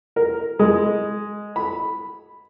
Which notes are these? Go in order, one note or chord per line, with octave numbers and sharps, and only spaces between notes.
A#4
G#3
B5